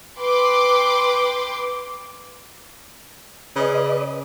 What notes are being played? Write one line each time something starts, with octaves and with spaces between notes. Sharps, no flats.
B4 G5 C6 D6
C#3 B4 D5 D#5